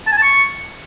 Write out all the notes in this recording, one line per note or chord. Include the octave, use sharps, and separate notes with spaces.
A5
G#5
A5
C#6